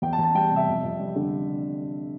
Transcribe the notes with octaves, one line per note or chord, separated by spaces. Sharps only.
E2 G5
A5
E2
A5
G3 G5
C3
E5
F2
F2
G3
D3